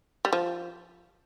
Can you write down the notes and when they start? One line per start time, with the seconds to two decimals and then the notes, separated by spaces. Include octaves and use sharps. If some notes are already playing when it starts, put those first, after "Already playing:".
0.25 G3
0.33 F3